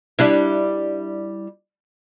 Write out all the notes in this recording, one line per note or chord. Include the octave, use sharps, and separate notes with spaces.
G3 D4 E4